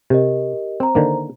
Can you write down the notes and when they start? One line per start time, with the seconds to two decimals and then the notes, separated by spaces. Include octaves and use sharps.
0.10 C3 G4 A#4 D#5
0.80 C4 C5 A#5
0.95 D3 D#3 A#3